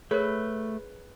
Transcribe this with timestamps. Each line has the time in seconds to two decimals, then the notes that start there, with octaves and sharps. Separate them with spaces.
0.11 A3 G#4 A#4 B4 C#5